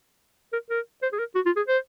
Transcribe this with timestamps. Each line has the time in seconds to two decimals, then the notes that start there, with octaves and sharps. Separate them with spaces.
0.53 A#4
0.70 A#4
1.03 C5
1.13 G#4
1.19 A#4
1.35 F#4
1.46 F4
1.57 G#4
1.68 C5